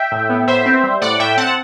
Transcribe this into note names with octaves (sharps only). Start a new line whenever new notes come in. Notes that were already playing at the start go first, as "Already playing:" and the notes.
Already playing: E5 G5
A2
B3
A2 C5 E5
C4
G3
A2 D5 F#5
A2 E5 G5
C4 F#5 A5